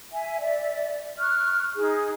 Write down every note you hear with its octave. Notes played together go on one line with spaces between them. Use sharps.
E5 G#5
D5 E5
C#6 F6 F#6
D#4 G#4